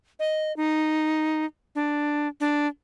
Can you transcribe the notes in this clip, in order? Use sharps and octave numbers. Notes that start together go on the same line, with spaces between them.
D#5
D#4
D4
D4